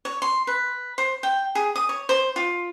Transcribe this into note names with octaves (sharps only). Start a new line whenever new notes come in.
C#5
C6
B4
C5
G5
G#4
D#6
C#5
C5
F4